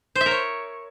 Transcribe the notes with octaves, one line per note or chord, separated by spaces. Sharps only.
C5
E5
A#4
C#5